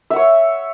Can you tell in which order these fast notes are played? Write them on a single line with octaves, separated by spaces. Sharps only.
E5 F#5 C#5